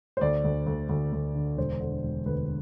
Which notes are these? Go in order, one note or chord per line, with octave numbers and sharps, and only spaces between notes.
C5
D2 D5
D2
D2
D2
D2
D3
E1 C5
D3
E1
D2 B4